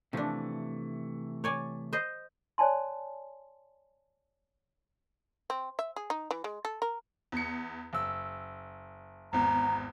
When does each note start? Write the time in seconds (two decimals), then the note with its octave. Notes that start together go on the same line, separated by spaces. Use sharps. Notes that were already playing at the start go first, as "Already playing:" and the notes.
0.13 C3 E3 F3 A3 D4
1.44 C#5 D5 G#5
1.93 C5 D#5
2.58 C#5 D5 G#5 A5 C6
5.50 C4
5.79 E5
5.96 G#4
6.10 D#4
6.31 E3
6.44 G#3
6.65 A4
6.82 A#4
7.32 E2 C#7
7.93 F#1 E6
9.33 G#1 E2 A#5